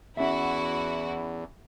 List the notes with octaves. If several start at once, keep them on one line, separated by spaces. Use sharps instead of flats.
E2 C#4 E4 F#4 E5